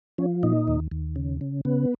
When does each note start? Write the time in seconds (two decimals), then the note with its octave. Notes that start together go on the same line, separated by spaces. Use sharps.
0.18 F3 C#4
0.43 A#2 D#4
0.68 D#2
0.92 D#2
1.16 C#3
1.41 C#3
1.65 C#3 B3